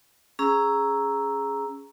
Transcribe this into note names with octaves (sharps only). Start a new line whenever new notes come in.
C#4 G#4 A#5 E6